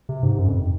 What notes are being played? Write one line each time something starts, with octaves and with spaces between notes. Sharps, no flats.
C3
G#2
F#2
F2